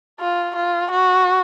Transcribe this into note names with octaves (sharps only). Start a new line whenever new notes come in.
F4
F4
F#4